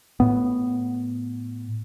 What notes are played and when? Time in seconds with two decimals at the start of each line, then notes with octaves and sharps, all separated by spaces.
0.20 A2 B3